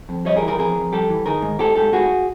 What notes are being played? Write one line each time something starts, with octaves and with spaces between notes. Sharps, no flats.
F2
G3 C#5 D#5
G#4 A#4
E3
G#4 A#4
F2 G#4 A#4
F2
G3 G4 A4
E3
D#3 G#4 A#4
G#2
G#2 G4 A4
G#2 G4 A4
G#2 F#4 G#4